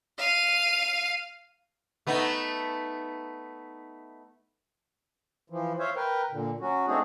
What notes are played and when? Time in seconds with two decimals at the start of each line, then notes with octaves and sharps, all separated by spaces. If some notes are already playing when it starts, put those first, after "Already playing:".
0.18 F5 D#7
2.07 A3 B3 D#4
5.50 E3 F3
5.79 C5 C#5 E5 F5
5.96 A#4 B4 G5
6.31 A#2 D3
6.60 F#3 C#4 F#4
6.87 A3 C4 D4 D#4 F#4 G#4